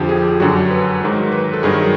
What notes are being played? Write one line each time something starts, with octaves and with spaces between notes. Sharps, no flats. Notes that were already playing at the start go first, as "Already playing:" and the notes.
Already playing: F2 D3 F3 G4
G#4
G4
F#2 D3 F#3 F#4
G4
B4
G#2 D#3 F#3
B4
A4
G2 D#3 F#3 G#4